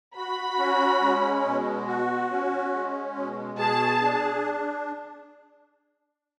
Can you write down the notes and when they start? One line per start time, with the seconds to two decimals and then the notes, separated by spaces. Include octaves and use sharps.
0.16 F#4 B5
0.59 C#4
1.01 G#3
1.45 B2
1.87 F#4
2.31 C#4
2.73 G#3
3.16 B2
3.59 G#4 A5
4.01 D4